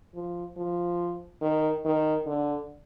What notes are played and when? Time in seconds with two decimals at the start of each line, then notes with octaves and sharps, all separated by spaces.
0.14 F3
0.57 F3
1.42 D#3
1.85 D#3
2.27 D3